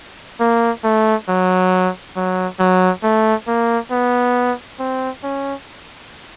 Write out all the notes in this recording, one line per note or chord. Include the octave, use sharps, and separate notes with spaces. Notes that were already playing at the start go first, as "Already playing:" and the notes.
A#3
A3
F#3
F#3
F#3
A3
A#3
B3
C4
C#4